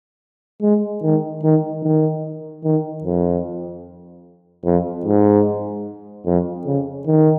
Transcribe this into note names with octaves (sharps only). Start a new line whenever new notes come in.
G#3
D#3
D#3
D#3
D#3
F2
F2
G#2
F2
C#3
D#3